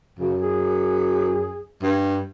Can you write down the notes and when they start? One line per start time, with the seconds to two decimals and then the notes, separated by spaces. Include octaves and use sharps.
0.19 F#2 C#3
0.42 G#4
1.82 G2